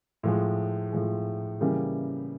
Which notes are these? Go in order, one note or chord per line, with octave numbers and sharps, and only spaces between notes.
A2 F3 G#3
A2 F3 G#3
C#3 E3 G3 A#3